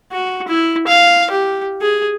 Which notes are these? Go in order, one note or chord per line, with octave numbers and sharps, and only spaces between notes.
F#4
E4
F5
G4
G#4